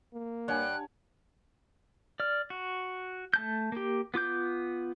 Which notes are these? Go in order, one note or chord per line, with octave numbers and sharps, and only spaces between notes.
A#3
G2 C#5 F#5 G#5 F#6
D5 F6
F#4
A3 A5 G6
A#3 G4
B3 F4 D6 G6